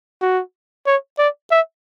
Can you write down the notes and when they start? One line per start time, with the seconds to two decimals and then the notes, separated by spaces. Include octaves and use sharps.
0.22 F#4
0.86 C#5
1.19 D5
1.51 E5